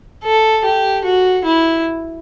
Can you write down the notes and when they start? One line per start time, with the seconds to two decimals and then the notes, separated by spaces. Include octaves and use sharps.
0.24 A4
0.65 G4
1.05 F#4
1.45 E4